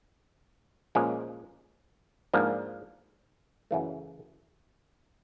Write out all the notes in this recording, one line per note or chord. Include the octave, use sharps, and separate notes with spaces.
A#2 F3 G#3 C#4
G#2 F3 A#3 D4
F#2 C#3 E3 A3